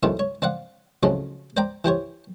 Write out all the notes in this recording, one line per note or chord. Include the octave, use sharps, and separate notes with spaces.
B1 E2 A2 D#3 C4 F#4
C#5
C4 D5 F5 F#5
A1 F2 C#3 F3 F#3 G#3
C5 D5 G5 A#5 D6
E3 G4 C5 C#5